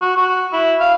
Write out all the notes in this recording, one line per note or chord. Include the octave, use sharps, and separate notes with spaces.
F#4
F#4
E4
F5